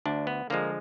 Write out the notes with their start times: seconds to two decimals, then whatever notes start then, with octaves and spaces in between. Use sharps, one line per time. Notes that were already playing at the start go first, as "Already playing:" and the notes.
0.06 D2 D4
0.27 B3
0.50 D3 F3 G#3 A#3